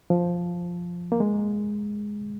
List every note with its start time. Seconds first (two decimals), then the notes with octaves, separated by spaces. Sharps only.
0.10 F3
1.12 A#3
1.20 G#3